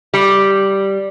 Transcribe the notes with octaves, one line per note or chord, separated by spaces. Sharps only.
G3